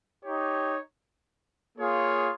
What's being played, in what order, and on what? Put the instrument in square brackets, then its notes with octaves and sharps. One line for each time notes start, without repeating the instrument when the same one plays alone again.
[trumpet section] D#4 G4 C#5
A#3 F4 G#4 C#5